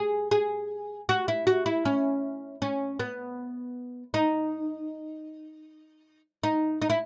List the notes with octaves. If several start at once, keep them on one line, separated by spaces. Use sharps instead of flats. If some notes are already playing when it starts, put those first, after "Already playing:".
Already playing: G#4
G#4
F#4
E4
F#4
E4
C#4
C#4
B3
D#4
D#4
D#4
E4